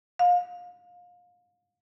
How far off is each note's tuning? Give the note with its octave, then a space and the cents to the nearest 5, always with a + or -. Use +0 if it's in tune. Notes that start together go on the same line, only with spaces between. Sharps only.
F5 +30